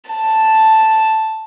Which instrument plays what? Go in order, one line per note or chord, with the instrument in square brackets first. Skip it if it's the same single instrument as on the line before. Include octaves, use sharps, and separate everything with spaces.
[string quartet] A5